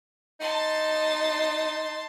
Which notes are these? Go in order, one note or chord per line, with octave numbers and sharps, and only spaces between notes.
D#4 A5 C6